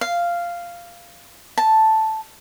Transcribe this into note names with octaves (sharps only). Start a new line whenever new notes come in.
F5
A5